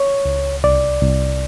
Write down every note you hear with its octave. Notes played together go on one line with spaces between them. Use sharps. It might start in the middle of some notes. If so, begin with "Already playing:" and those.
Already playing: C#5
C#2
C2 D5
C2